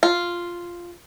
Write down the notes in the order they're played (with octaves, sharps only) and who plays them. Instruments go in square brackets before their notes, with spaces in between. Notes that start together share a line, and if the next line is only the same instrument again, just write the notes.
[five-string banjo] F4